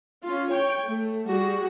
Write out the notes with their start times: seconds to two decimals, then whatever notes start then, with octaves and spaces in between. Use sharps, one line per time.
0.23 C#4 F4
0.51 C#5 G5
0.86 A3
1.27 G3 F#4 G#4